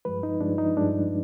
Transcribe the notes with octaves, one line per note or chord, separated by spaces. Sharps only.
G2 F3 G#3 B4
D#4
G2 F3 G#3 D4
D#4
G2 F3 G#3 D4